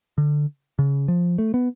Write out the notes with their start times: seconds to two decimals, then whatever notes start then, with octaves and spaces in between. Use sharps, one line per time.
0.18 D3
0.79 C#3
1.08 F3
1.38 A3
1.54 B3